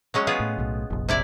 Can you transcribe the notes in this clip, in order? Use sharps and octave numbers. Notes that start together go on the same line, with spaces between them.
F#3 G#3 C#4
B3 F4 G#4
A2
B1 A2
F1 A#1
C3 E4 D5